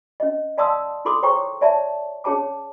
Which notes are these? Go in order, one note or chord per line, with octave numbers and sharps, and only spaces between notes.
C#4 D#5
D5 F5 A5 C6 D#6 E6
E4 F4 A4 C6 D6 D#6
G#4 C5 C#5 G5 A#5 C#6
C#5 D5 E5 A5
C#4 G#4 C#5 A5 D6